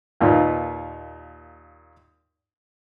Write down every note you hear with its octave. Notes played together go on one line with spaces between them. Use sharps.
D#2 A#2 D#4 B4